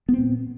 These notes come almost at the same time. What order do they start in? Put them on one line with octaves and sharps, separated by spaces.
B3 C4 A#2